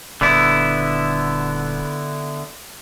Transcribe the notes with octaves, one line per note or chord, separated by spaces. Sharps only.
D#1 D3 B3 E4